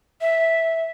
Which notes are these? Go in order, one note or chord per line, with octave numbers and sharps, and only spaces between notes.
E5